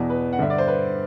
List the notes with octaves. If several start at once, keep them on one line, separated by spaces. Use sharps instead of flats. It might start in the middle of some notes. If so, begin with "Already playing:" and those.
Already playing: E2 B2
B4
F#5
G2 D3 E5
D5
C5
B4